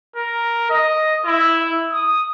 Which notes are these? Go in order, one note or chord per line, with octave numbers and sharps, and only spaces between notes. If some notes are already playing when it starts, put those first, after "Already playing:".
A#4
D#5
E4
D#6